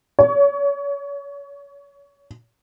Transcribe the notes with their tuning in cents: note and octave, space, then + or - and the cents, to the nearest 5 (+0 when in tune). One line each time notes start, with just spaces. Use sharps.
C#5 +30